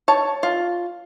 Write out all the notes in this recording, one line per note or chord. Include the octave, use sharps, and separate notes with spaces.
C#5 A5
F4